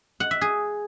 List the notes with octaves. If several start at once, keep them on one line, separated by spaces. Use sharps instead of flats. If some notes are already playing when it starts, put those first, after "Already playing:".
F#5
E5
G#4